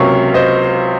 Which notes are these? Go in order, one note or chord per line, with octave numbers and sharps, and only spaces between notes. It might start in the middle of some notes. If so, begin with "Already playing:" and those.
Already playing: C#2 C3 F#3 A#3 C#4 C#5 F5
C5 D#5